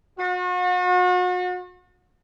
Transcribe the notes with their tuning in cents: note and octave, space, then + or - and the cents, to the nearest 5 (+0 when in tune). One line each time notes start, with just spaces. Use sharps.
F#4 -40